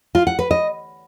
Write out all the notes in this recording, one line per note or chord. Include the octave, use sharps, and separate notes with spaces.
F4
F#5
B4
D#5